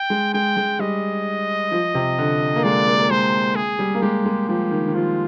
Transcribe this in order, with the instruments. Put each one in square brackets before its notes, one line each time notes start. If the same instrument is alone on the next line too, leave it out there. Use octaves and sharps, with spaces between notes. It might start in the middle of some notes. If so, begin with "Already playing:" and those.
Already playing: [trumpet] G5
[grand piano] G#3
[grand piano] G#3 [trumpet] G5
[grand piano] G#3
[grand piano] G3 [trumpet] D#5
[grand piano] F3
C3
D3
A#3
[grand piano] G#3 [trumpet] D5
[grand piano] A#3
A#3
[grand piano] G#3 [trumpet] C5
[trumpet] G#4
[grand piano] G3
A#3
[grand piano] G#3 [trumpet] G4
[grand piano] G#3
[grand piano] F3 [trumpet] G4
[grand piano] D#3
D#3
[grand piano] F3 [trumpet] F4